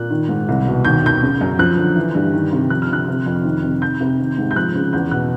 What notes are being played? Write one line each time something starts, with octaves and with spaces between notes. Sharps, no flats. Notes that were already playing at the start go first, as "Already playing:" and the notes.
Already playing: A#2 F#6
D#3
G#2
C2
B2
D#2 G6
D#3 G6
C#3
F#2
F3 F#6
D3
E3
G2
D#3
C3
F3 F#6
F6
D3 F#6
C3
F2
D#3
C3
D#3 G6
C3
D#3
G#2
G6
F3 F#6
C#3
E2 G6
B2 F#6